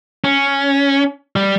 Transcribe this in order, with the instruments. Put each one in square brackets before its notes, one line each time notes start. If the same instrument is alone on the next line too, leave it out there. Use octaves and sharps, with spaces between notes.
[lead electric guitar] C#4
G3